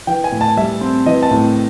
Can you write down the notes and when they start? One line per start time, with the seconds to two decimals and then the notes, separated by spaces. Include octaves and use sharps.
0.07 E3 G5
0.24 G#5
0.32 A2
0.41 A5
0.57 G3 E5
0.81 C4
1.06 E3 D#5
1.23 A5
1.31 A2